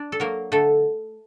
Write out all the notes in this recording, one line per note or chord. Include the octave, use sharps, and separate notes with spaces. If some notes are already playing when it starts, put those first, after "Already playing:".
Already playing: D4 D5
A4
F#3 A#3 A#4
D3 A3 A4